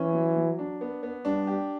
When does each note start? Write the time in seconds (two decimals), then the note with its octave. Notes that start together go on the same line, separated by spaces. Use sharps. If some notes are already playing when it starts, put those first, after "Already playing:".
Already playing: E3 C#4
0.13 F#3
0.36 F#3
0.59 D4
0.81 B3
1.03 B3
1.25 G3 D4
1.47 G4